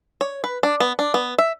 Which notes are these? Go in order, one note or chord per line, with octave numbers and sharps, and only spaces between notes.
C#5
B4
D4
B3
D4
B3
E5